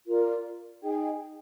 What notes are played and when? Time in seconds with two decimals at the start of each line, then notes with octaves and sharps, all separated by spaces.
0.06 F4 A#4 D5
0.83 D#4 G#4 D#5 G5